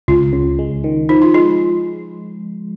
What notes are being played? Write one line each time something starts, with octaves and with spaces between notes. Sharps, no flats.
C#2 F4
C#3
G#3
D#3
F3 D#4
F4
G#3 F4